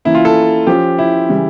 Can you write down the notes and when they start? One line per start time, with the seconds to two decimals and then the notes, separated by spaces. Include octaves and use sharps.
0.05 E3 A#3 C#4 E4
0.15 F4
0.25 A4
0.67 F3 C#4 F4 G4
0.98 E4
1.29 C#3 E3 G3